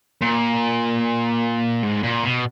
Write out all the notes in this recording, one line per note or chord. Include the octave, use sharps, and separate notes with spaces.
A#2
G#2
A#2
B2